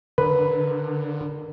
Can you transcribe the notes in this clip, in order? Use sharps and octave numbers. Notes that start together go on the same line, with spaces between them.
D3 A#4 B4